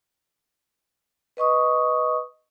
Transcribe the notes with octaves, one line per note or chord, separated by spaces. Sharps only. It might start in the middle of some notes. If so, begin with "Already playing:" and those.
B4 D#5 C#6 D#6